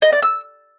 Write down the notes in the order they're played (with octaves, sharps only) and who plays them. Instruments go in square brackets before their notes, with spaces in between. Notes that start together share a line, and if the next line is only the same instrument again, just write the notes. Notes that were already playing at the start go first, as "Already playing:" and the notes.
[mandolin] D#5
D5
E6